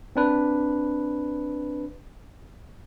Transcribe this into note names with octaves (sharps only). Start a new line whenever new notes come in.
C4 D4 B4